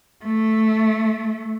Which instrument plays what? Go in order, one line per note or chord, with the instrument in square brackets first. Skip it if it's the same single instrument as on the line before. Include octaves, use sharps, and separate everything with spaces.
[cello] A3